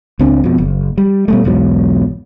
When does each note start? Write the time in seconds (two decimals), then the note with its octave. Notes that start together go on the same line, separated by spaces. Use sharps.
0.19 C#2 C4 D4
0.44 F2 B2
0.58 F#1
0.98 G3
1.28 B2 G3 A3
1.44 B1 E2 G#2 F#3